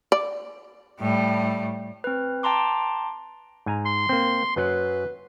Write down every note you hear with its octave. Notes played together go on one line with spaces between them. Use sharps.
D5
A2 G3
C4 B4
G5 A5 A#5 C6 D6
G#2 G#5 A#5
C6
A#3 C4
F#2 F#3 B4 F#5